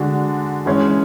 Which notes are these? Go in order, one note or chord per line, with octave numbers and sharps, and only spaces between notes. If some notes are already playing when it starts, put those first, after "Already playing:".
Already playing: D3 G#3 D4 F#4
E3 G#3 C#4